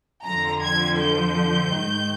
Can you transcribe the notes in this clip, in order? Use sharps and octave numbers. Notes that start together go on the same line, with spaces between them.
F2 D3 F3 A#5
G#6
G6
G#2 D#3 G#3